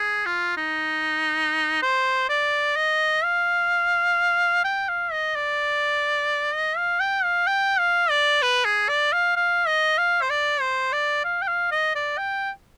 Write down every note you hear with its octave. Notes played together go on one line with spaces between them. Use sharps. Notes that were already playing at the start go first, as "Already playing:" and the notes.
Already playing: G#4
F4
D#4
C5
D5
D#5
F5
G5
F5
D#5
D5
D#5
F5
G5
F5
G5
F5
D5
B4
G#4
D5
F5
F5
D#5
F5
C5
D5
C5
D5
F5
G5
F5
D#5
D5
G5